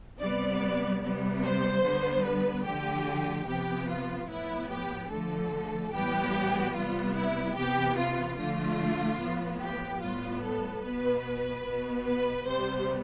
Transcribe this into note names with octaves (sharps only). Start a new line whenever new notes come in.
C3 G3 B3 D5
C3 G3 B3
C5
D3 G3 B3
B4
D3 F3 A3 G4
C3 F3 B3 G4
F4
A2 F3 B3 E4
G4
D3 F3 A3 A4
A2 E3 G3 B3 G4
C3 G3 B3 F4
E4
C3 E3 B3 G4
F4
D3 F3 A3 F4
A2 F3 B3
G4
A2 G3 B3 F4
A4
B2 B3 B4
B2 B3
B4
C3 G3 B3 C5